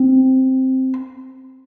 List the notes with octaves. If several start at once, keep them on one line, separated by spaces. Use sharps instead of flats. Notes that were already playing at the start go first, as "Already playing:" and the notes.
Already playing: C4